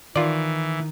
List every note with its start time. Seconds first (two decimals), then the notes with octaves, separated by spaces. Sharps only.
0.16 D#3 E3 F4 D5